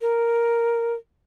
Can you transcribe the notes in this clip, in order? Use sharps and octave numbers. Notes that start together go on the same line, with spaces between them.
A#4